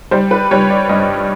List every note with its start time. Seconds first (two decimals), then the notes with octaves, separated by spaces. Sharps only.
0.11 G3 C5
0.31 B4
0.51 G3 C#5
0.70 D5
0.89 G2 D#5